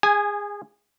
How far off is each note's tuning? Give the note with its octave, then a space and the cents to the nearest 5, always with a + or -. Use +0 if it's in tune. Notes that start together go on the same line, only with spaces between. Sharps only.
G#4 -25 G#5 +0